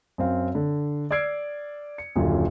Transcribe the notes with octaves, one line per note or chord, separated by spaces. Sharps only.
F#2 C4 F5
D3
D5 E6 F6 G#6 C7 D7
C#7
D#1 F#2 D3 F4